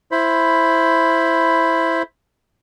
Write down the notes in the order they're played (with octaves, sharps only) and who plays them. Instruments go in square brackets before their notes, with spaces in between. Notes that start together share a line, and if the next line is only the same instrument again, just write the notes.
[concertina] E4 C5 B5